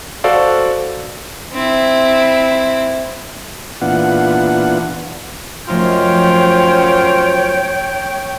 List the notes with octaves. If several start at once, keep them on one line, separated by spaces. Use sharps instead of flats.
F#4 A4 C5 D5 F5
C4 E4
A#2 E3 B3 D4 F4 F#5
F#2 F3 A3 D#4 F4 C5 C#5 G5